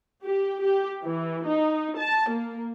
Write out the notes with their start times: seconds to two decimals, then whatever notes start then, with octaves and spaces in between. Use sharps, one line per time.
0.24 G4
0.61 G4
1.04 E3
1.46 D#4
1.98 A5
2.30 A#3